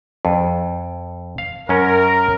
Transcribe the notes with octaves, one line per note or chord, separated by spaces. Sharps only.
F2
F5
F#2 C#4 A#4